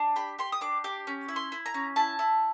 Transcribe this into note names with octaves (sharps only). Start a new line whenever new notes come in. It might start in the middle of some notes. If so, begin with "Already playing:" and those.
Already playing: D4
G4 B5
G4 C6
D#6
D4 D6
G4 D6
C#4
E4
C6
E4
A#5
C#4
E4 A5
E4